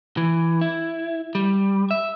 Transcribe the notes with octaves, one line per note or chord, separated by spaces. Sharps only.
E3
E4
G3
E5